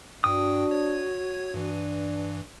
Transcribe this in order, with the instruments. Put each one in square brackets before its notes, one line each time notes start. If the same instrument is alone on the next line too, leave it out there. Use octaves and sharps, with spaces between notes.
[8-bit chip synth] G2 G5 [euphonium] D4 [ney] F#4 [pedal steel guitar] D#6
[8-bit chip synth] C#5 G#6
[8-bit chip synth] G2 E3 [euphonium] D4